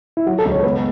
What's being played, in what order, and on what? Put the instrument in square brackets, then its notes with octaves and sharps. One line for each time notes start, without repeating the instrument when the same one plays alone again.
[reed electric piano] E4
[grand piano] F#3 [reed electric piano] F#4
[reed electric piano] A4
[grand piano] C#2
[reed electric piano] C#5
[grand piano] B3 [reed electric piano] B4